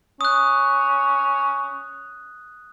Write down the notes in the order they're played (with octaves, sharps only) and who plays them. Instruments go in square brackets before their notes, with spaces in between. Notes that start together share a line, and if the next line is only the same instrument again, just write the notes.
[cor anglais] C#4 [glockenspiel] D#6 F#6